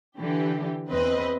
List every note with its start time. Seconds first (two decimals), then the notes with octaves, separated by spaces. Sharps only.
0.18 D3 E3 G4
0.90 E2 C4 B4 D#5